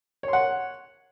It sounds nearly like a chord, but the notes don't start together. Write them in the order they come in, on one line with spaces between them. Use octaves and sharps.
C#5 C6 F#5